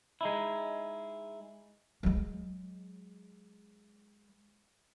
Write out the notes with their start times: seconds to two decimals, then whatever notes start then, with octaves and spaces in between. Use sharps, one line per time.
0.21 G#3 D#4 E4
2.03 F#3 G#3